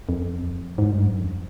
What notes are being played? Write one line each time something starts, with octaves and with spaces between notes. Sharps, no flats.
F2
G#2
G2
F#2
F2